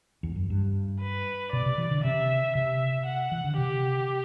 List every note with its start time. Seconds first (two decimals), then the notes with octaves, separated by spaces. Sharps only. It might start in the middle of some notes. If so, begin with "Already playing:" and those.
0.23 E2
0.36 F#2
0.50 G2
1.01 B4
1.52 B2 D5
1.66 C3
1.78 E3
1.91 D3
2.04 C3 E5
2.55 C3 E5
3.06 F#5
3.31 E3
3.44 D3
3.58 C3 G4